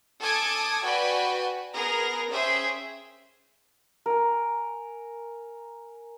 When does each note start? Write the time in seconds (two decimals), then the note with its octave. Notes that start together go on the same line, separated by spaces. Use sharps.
0.22 A4 G#5 A5 D6 D#6 G#6
0.83 F#4 B4 D5 G5 G#5
1.73 B3 G#4 A#4 A#5
2.31 C#4 G#4 C5 E5 G5
4.06 A#4 G#5